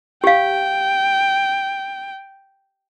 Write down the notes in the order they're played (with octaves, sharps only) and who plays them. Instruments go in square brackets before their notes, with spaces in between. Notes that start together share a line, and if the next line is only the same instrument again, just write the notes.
[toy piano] G4 F5 [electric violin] G5